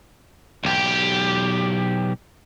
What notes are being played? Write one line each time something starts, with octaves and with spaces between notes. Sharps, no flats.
B1 G4